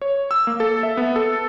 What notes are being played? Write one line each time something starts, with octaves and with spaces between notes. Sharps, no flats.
C#5
E6
A#3
A4
E5
B3
A4